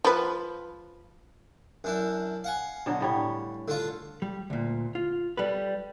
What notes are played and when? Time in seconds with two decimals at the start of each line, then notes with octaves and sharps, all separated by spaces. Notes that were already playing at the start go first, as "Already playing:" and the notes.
0.04 F3 B4
1.84 F#2 D4 E4
2.44 F5 F#5 G#5
2.86 B2 D3 F#3
3.01 A2 G3 C#5
3.68 D3 D4 F4
4.22 G3
4.50 D2 A#2
4.95 F4
5.37 G3 A4 B4